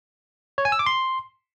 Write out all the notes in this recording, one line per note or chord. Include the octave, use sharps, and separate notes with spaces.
C#5
G#5
E6
D6
C6